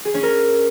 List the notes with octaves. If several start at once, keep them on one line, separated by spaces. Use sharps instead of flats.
G#4
C#4
A#4